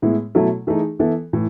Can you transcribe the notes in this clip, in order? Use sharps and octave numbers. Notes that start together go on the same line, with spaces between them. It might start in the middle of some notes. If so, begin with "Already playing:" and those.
A2 G#3 B3 E4
B2 F#3 A3 E4 A4
E3 A3 D#4 G#4
E3 B3 E4 A4
A2 E3